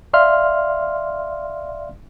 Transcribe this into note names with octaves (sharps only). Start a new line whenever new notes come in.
D5 E5 F5 C6 F6